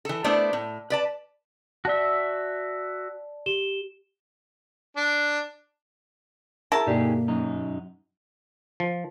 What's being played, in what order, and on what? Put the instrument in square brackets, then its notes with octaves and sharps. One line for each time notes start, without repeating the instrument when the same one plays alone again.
[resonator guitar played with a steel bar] E3 A4
A3 B3 D4 E4 C5 D5
A2
B4 D5 A5
[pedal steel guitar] F#4 E5 [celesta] D5 A5
[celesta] G4 E7 G7
[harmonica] D4
[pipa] E4 A#4 A5 [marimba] G#4 C#6
[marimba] G2 B2 D5 [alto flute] A#3 [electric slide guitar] D#4 G4 G#4
[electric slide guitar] F#2 D#4
[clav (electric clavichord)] F3